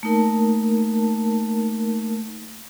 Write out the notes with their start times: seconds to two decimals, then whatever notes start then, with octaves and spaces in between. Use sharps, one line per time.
0.03 A3 A#3 D#4 A#4 A5